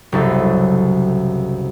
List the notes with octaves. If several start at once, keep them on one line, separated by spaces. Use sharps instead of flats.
F#1 C2 A4